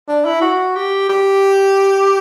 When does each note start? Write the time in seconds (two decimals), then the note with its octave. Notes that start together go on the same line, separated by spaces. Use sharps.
0.08 D4
0.25 E4
0.41 F#4
0.76 G4
1.09 G4